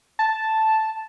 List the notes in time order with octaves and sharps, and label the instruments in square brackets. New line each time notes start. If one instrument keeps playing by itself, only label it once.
[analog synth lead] A5